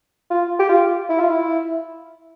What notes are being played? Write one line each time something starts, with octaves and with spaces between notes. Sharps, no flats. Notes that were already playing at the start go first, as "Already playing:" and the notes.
F4
G4
F4
E4
F4
E4